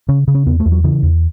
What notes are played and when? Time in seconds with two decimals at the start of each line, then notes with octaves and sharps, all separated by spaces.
0.08 C#3 C#4
0.27 C#3
0.35 C#4
0.46 E2 B3
0.60 A3
0.66 E2
0.72 F#3
0.84 C#3 E3
1.03 E2